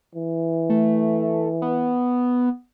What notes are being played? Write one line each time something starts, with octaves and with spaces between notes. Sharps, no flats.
E3
A3
B3